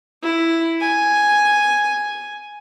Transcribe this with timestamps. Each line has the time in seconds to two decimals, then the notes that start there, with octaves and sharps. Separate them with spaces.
0.24 E4
0.82 G#5